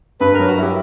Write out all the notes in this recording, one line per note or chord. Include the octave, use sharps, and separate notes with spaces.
G2 B4
A#4
F#3
F#4
E4 G4